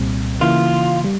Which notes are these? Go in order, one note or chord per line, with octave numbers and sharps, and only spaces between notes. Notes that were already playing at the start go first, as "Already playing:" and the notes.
Already playing: C2 A#2 G3 C4
C#3 E3 A#3 E4 F4
G3